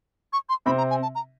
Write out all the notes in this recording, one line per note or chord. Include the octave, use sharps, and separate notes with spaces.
C#6
C6
C3 C4 B5
A#5
G#5
A5
A#5